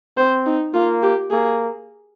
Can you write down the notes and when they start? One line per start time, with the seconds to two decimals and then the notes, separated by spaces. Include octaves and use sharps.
0.17 C4 C5
0.46 D#4
0.74 A#3 F4
1.03 G4
1.31 A#3 G#4